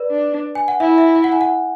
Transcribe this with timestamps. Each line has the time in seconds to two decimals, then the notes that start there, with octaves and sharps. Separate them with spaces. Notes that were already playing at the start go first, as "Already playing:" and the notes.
Already playing: B4 D5
0.11 D4
0.55 G#5
0.68 F#5
0.80 E4 E5
0.98 E5
1.15 E5
1.24 F#5
1.32 G#5
1.41 F#5